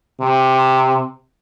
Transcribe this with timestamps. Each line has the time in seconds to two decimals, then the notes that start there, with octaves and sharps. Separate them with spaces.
0.21 C3